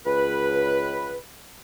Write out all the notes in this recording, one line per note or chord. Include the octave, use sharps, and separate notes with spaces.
C#2 B4